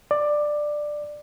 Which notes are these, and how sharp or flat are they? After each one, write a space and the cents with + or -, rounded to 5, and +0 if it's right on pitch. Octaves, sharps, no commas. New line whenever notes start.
D5 +10